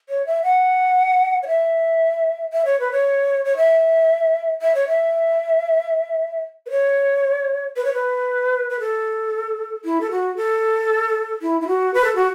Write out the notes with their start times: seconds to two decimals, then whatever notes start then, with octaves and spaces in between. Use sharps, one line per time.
0.09 C#5
0.27 E5
0.43 F#5
1.43 C#5
1.48 E5
2.53 E5
2.65 C#5
2.80 B4
2.92 C#5
3.45 C#5
3.57 E5
4.62 E5
4.75 C#5
4.88 E5
6.66 B4
6.70 C#5
7.76 B4
7.85 C#5
7.93 B4
8.70 B4
8.80 A4
9.85 E4
10.01 A4
10.11 F#4
10.37 A4
11.42 E4
11.61 E4
11.67 F#4
11.94 B4
12.04 A4
12.16 F#4